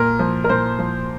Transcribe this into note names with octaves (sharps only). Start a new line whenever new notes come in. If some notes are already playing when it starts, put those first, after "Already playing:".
Already playing: A#2 A#4
F3
A#4
A#2 C5
F3